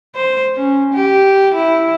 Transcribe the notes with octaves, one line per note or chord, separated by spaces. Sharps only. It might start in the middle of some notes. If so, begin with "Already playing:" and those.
C5
C#4
G4
E4